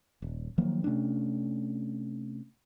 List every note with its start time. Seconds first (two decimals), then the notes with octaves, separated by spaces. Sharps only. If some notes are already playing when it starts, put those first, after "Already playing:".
0.22 D#1
0.58 D#3 F3 F#3 A#3
0.84 C3 A3 C#4 D4